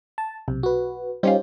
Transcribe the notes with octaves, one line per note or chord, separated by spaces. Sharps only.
A5
B1 C3
F#4 B4
G3 C#4 D#4 F4 G4 C5